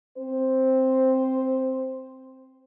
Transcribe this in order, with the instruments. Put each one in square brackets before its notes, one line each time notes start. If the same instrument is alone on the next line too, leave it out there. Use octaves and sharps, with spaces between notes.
[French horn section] C4 C5